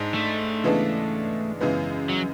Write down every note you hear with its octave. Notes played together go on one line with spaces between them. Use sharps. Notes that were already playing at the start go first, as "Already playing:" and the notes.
Already playing: G#2 G#3 D4
A3
C#3 E3 G#3 B3 D4
F#2 C#3 E3 G#3 B3
F#3